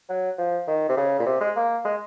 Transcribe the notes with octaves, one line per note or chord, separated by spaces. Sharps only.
F#3
F3
D#3
C3
C#3
A#2
C3
G#3
A#3
G#3